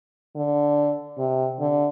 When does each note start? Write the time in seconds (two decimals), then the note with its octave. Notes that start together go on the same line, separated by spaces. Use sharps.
0.36 D3
1.18 C3
1.60 D3